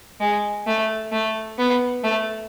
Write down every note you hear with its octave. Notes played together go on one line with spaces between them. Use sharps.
G#3
A3
A3
B3
A3